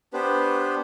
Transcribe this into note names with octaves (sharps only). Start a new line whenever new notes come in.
B3 D4 G4 B4 C5